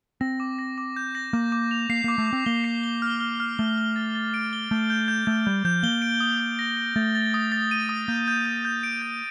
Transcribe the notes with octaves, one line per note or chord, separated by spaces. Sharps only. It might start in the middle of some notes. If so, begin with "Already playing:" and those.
C4 A#6
D6
A#6
D6
G6
A#6
A#3 D6
D6
F7
A#3 C7
A#3 D6
A3
D6
C4
A#3 G7
C7
G7
F6
F6
F6
A3 G7
G7
A6
A6
D7
G7
A3 G6
G6
G6
A3 G6
G3 G6
F3 G6
A#3 G7
D7
D#6
D#6
A#6
D7
A3 A6
A6
D#6
A6
D#7
D#6
A#3 G6
G6
G6
G6
D7
G6